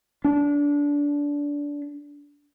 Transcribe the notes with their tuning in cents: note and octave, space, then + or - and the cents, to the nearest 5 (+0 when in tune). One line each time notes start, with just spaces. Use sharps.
D4 -20